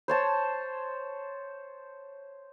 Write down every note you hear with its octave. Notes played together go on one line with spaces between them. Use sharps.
C5 C#5 A5